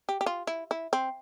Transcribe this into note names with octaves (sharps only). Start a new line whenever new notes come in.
G4
G4
F4
E4
E4
C4